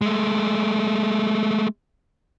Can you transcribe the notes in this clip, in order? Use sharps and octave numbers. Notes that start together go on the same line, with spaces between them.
G#3 A3